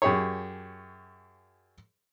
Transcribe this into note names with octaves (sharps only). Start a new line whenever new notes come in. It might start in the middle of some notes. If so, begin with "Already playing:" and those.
F#2 G4 G#4 C#5